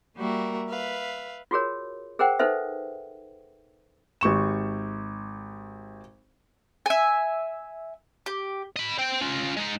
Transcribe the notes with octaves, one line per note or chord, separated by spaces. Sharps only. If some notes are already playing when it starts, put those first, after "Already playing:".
G3 A#3 F#4 A#4 E5
B4 E5 F5
F4 F#4 G#4 A#4 C#5
G#4 A#4 C5 F#5 G5
D#4 A4 B4 C5 E5
G#1 G4 C#6 E7
E5 G#5
G4
D#5 B5
C5 G5
C#4 F4
G#3 D#4